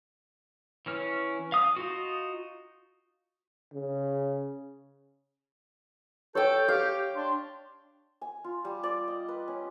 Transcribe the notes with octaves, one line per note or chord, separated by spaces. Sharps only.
E3 C#4 F6
F5 D#6
D#4 F4 F#4
C#3
A4 C#5 G5 G6
G4 F5
D4 C6
G#5
F4
G3
D5
D#5
B4
C#4